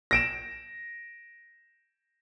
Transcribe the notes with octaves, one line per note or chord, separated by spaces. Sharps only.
A#6 D7 E7